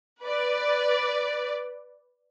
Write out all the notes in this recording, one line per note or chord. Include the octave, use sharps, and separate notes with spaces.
B4 D5